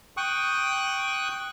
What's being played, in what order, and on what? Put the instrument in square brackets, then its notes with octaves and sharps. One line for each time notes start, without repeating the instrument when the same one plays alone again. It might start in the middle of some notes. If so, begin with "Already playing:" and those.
[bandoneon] G5 C#6 D#6 F#6